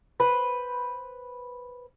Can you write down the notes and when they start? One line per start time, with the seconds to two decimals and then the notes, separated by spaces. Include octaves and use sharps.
0.20 B4 C5